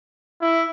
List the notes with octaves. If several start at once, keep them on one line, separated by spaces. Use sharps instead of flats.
E4